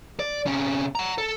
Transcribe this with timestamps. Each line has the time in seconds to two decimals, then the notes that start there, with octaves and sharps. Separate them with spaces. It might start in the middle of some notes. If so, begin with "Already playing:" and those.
0.19 D5
0.46 C3 C#4
0.95 F#5 A#5
1.18 A4